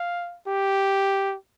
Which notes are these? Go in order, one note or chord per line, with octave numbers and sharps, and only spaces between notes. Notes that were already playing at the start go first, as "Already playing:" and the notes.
Already playing: F5
G4